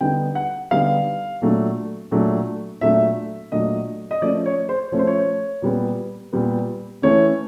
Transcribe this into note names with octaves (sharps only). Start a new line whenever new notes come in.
D3 G3 B3 D#4 G5
F#5
D3 G3 B3 D#4 F5
A#2 F#3 A3 D4
A#2 F#3 A3 D4
A#2 F#3 A3 D4 E5
A#2 F#3 A3 D4 D#5
D#5
F3 A3 C#4 D5
C#5
C5
F3 A3 C#4 C#5
C5
C#5
A#2 G3 B3
A#2 G3 B3
E3 A3 C#4 C#5